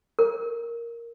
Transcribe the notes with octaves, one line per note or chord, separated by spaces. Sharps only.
A#4